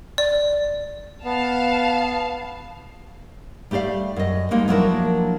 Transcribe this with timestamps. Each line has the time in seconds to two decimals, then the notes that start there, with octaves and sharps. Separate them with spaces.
0.18 D5
1.25 B3 F5 A5
3.71 G3 A3 G4 D5 F5
4.16 F#2 D#5
4.51 G3 G#3 A#3 D#4
4.68 F3 F#3 A#3 D4 E4 A#4